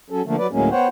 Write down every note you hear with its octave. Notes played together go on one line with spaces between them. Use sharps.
F#3 C#4 A4
D3 F3 A3 A#3
F#3 B4 D5
D2 A2 F#3 G#3 A#3 C#4
B3 C5 C#5 F#5 G5